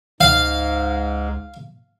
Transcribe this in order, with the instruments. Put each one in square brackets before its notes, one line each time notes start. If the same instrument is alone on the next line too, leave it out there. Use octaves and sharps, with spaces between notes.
[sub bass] C#2 [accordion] G#2 [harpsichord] F5